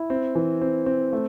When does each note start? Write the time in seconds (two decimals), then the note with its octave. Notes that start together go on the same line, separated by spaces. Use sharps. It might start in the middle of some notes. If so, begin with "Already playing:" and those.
Already playing: E4
0.10 C4
0.35 E3
0.61 C4
0.86 C4
1.13 A3